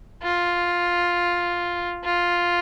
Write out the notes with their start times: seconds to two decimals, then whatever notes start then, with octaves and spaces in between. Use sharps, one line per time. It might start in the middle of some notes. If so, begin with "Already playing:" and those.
0.23 F4
2.04 F4